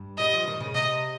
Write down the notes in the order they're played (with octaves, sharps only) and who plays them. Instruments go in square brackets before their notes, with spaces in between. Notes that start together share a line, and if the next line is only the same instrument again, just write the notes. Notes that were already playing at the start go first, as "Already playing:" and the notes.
Already playing: [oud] G2
[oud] G3 [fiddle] D#5
[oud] F3
D#3
C#3
[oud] C3 [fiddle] D#5